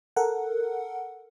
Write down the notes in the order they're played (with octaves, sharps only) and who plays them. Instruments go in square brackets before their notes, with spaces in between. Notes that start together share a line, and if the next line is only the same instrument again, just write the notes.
[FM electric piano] A4 A#4 F#5